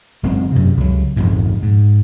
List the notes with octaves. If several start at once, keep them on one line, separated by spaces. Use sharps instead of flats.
F#1 G#3 C4
F#2 C3
C#2 F#3
A#1 F2 G#2
G#2